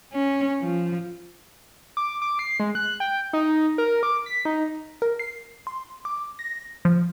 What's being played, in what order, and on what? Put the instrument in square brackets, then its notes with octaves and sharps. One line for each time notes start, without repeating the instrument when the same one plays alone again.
[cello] C#4
F3
[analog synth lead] D6
D6
C7
G#3
F#6
G5
D#4
A#4
D6
B6
D#4
[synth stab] A#4
C7
C6
D6
A#6
F3